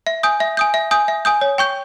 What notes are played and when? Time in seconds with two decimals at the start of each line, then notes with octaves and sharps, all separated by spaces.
0.07 E5
0.23 G#5 D#6 G6
0.40 E5
0.57 G#5 D#6 G6
0.74 E5
0.91 G#5 D#6 G6
1.08 E5
1.25 G#5 D#6 G6
1.41 C#5
1.58 G5 C#6 G6